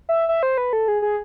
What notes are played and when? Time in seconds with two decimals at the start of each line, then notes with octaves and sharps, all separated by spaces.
0.09 E5
0.29 E5
0.43 C5
0.58 B4
0.73 A4
0.88 G#4
1.02 G#4